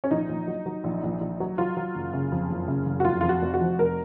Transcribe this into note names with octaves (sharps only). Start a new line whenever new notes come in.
C#4
A#1 D#4
A#1
F#3
F#3
A#1
A#1
A#1
F#3
F#3 F4
F#3
F#1
C#3
F2
F#1
C#3
F#1
F#4
F1 F4
F2 F4
F#4
F1
F#4
F3
F1 A#4